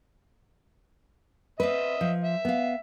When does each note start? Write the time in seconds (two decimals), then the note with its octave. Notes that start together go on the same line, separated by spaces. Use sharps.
1.60 C4 B4 D#5 E5
2.01 F3
2.24 E5
2.45 B3 F5